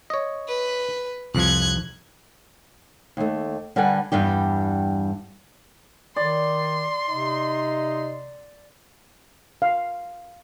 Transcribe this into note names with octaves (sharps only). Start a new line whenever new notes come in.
C#5 D#5
B4
C2 F2 F3 F#6 G#6
D#2 A3
D3 G3 B4 F#5 G#5
E2 G2 G3 G4
D#3 D5 C6
C3 D#4
F5